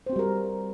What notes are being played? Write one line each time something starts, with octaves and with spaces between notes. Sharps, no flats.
G3 C4 F#4 A#4 C5